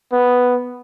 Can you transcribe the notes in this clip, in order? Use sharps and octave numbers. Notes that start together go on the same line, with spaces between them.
B3